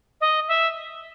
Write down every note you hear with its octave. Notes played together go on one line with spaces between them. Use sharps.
D#5
E5